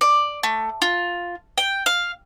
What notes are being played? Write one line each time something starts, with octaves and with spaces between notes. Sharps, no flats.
D5
A3
F4
G5
F5